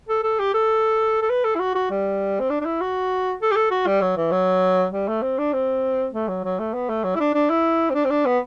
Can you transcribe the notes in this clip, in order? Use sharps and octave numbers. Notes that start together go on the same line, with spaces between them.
A4
A4
G4
A4
A4
B4
A4
E4
F#4
F#4
G3
C4
D4
D4
E4
F#4
A4
G4
A4
F#4
G3
F#3
E3
F#3
G3
A3
C4
D4
C4
A3
F#3
F#3
A3
B3
A3
F#3
E4
D4
D4
E4
C4
D4
C4
D4
B3